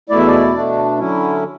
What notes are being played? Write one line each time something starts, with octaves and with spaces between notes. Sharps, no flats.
E2 B2 A3 E4 D5
E5
D5
B2 A3 D4
D3 F#3 C#4 E4